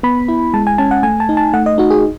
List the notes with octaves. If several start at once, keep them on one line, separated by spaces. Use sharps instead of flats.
B3 B5
E4
G#3 A5
G#5
C#4 A5
F#5
A3 G#5
A5
D#4
A5
A3 F#5
D#5
D#4 F#4
G#4